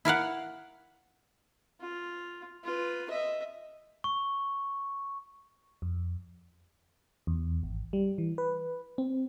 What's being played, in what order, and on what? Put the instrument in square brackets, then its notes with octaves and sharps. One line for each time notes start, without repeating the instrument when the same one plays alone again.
[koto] E4 A#4 F5 F#5
[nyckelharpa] F4
F4 B4
D#5 E5
[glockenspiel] C#6
[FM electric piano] F2
E2
G#1
G3
E3
B4
C4